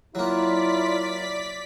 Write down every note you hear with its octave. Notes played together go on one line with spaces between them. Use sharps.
F#3 A#3 E4 F4 D5 B6